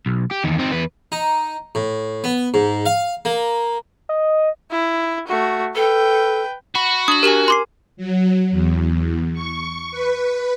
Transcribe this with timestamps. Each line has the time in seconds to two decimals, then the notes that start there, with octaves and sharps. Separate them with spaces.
0.06 B1
0.31 G4
0.44 E2 D#3
0.59 C4 D#4
0.72 E2 B4
1.12 D#4
1.75 A2
2.24 B3
2.54 G#2
2.86 F5
3.25 A#3
4.09 D#5
4.71 E4
5.28 A3 F#4
5.75 A4 B4 G5
6.75 F#4 B5
7.08 D4 D#6 F#7
7.23 G4 A#4 G#5 E7 F#7
7.48 C6 D6 C7
7.97 F#3
8.51 E2
9.33 C#6
9.91 B4